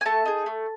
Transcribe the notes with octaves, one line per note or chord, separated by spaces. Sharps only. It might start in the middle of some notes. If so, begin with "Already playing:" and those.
G#5
A3 A5
D#4 G#4
A3